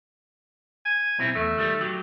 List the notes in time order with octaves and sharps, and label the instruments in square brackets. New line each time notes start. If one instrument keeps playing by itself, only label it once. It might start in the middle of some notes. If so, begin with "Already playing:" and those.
[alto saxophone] G#5
[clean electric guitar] B1 C4 E4
[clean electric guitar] E2 [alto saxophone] A3
[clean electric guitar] D#3 G3
F#3 G4